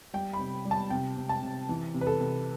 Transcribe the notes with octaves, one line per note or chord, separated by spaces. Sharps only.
G3 G5
B5
C3
G3
A5
C3 G5
C3
A5
C3
E3
C3
B4
A4
C3